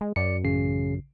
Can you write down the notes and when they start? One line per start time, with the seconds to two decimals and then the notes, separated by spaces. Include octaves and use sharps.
0.01 G#3
0.16 F#2 D5 C#7
0.44 A1 C#3 C7